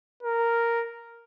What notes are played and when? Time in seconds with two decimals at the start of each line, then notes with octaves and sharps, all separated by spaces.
0.23 A#4